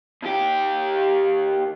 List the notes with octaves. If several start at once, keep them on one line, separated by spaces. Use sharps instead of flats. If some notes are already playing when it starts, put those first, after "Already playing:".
D#2 G4